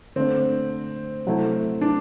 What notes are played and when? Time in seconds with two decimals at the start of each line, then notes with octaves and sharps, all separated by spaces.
0.16 D3 A3 C4 D4
1.26 C3 F#3 A3 E4
1.81 D4